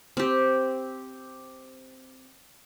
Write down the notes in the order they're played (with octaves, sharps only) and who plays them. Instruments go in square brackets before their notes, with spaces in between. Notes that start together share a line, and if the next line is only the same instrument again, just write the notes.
[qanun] C4 G4